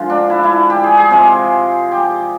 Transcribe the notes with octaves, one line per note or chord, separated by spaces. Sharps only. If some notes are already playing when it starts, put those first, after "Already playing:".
Already playing: D3 F3 G#3
D4
E4
E4
G4
G#4
G#4
C3 F3 G#3
G4